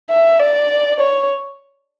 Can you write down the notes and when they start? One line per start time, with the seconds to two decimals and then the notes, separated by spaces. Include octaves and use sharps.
0.10 E5
0.40 D5
1.00 C#5